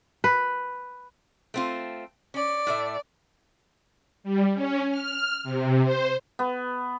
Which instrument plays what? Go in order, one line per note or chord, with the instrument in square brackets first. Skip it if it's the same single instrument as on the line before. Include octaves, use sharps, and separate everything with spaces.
[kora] B4
[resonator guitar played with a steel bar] A3 C4 F4
[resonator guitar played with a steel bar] C#4 [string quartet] D5
[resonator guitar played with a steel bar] A2 A3 E5
[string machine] G3
C#4
F6
C3
C5
[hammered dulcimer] B3